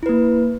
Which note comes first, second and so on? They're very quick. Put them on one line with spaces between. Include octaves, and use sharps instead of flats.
E4 B4 A#3